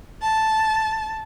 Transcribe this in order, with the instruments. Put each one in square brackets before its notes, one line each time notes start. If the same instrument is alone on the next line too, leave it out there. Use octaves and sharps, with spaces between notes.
[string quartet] A5